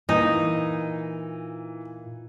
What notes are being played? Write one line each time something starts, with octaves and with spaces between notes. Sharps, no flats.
A#2 E3 D#4